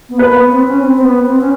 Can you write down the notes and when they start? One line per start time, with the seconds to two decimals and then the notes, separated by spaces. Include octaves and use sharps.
0.09 B3
0.18 A#3 B4
0.28 A#3
0.36 B3
0.52 C4
0.68 C#4
0.84 C4
0.98 C4
1.05 B3
1.26 C4
1.41 C#4